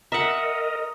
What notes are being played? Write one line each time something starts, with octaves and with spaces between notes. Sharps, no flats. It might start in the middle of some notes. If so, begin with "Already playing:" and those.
A#4 D#5 E5 F#5 A#5 D#6